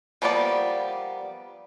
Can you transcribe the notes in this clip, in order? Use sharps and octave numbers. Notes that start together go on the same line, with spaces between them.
F3 G3 A#3 B3 D5